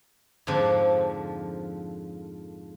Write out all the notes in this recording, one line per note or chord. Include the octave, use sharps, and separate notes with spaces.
F2 G#2 D3 F3